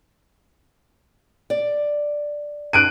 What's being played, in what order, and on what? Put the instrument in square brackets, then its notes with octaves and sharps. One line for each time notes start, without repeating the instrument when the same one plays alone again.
[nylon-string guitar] D5
[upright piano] F#6 D7 D#7